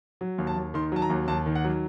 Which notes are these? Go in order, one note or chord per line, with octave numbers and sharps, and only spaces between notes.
F#3
D#2
A5
D#2
D#3 C6
F#3 A5
A#5
D#2
D#2 A5
D#3
F#5
F#3